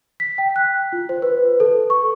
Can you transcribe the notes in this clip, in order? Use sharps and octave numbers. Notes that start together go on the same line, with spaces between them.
B6
G5
F#6
F4
C5
B4
A4
C#6